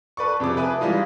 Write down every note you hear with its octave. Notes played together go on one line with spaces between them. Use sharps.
A4 B4 D5 C#6
F2 C3 G#4 D6
A4 B4 E5 G#5 D#6
E3 G3 G#3 D#4 F4